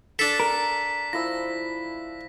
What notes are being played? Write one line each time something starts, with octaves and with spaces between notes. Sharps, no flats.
D4 A4 B6
A#4
F3 E4 E6 A#6